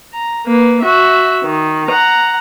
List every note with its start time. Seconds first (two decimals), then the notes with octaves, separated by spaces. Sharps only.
0.14 A#5
0.46 A#3 B4
0.82 F#4 E5
1.44 D#3
1.88 F#5 A#5